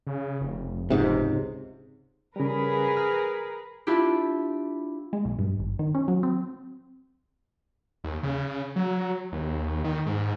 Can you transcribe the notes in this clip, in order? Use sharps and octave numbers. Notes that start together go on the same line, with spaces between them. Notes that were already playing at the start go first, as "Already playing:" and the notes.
C#3
F1
C#2 G#2 C3
C#3 G3 G#4 A#4 B4
F6
D4 E4 F4 G4
G#3
B1
G2
G#1
D#3
C#4
F#3
C4
D#2
C#3
F#3
D#2
D#3
G#2